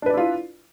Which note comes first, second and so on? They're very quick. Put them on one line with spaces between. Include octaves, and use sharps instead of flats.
D4 B4 D5 E4 F4